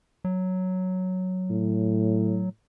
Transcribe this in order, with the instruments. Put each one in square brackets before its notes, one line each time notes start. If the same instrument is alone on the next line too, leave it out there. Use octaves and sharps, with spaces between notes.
[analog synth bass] F#3
[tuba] A2